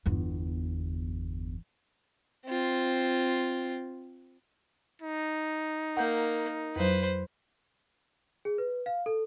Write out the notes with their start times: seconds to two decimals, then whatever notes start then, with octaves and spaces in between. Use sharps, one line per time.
0.06 G1 E2
2.46 C4 F4
5.02 D#4
5.97 A#3 F#5 G6
6.76 F2 F#3 B4 C5
8.45 G#4
8.58 B4
8.86 F5
9.06 A4